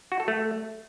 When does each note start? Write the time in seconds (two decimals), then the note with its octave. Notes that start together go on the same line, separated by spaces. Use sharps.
0.12 F#4
0.20 A4
0.28 A3